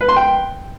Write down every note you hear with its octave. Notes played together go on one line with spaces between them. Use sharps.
B4
C6
G5